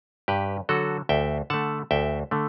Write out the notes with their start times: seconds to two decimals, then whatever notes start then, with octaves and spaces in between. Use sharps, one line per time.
0.28 G2 G4 B4
0.69 D3 F#3 F#4 A4
1.09 D2 E5 G5
1.50 D3 A3 F#5 A5
1.91 D2 E5 G5
2.31 D3 A3